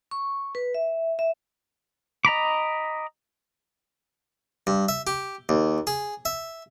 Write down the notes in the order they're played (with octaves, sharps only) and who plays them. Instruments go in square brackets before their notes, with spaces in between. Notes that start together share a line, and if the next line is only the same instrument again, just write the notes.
[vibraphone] C#6
B4
E5
E5
[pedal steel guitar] D#5 A#5 B5 D6
[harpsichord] G2
E5
G4
D#2
G#4
E5